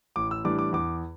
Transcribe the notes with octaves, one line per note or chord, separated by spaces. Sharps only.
A1 D6
E6
A2 E3 G3 D4 D6
D6
E2 D6